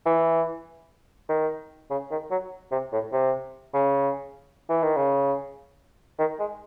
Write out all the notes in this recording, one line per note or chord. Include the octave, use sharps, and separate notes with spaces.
E3
D#3
C#3
D#3
F#3
C3
A2
C3
C#3
E3
D#3
C#3
D#3
G#3